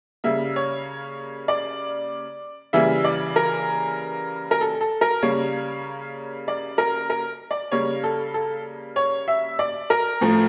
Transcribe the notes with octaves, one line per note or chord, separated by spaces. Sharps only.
C#3 G3 A#3 E5
C#5
D5
C#3 E3 G3 A#3 E5
D5
A#4
A#4
A4
A4
A#4
C#3 G3 A#3 C#5
D5
A#4
A#4
D5
C#3 G3 A#3 C#5
A4
A4
C#5
E5
D5
A#4
A2 F3 A3